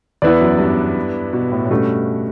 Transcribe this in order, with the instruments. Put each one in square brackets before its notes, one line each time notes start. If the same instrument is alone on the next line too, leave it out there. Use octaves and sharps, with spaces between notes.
[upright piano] E2 [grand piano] B3 E4 B4 D5
[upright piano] F#2
G2
B2
A2
A2
[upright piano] G2 [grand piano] B2 A3 C#4 F#4